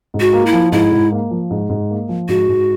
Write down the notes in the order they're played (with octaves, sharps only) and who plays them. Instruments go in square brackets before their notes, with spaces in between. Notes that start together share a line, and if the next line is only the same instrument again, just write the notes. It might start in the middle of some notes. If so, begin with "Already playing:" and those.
[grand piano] G#2
[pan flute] F#4
[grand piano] A#3
[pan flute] E4
[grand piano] F3
[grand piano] G#2 [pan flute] E4
[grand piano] G#2
A#3
F3
G#2
G#2
A#3
F3
[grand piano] G#2 [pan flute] F#4
[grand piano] G#2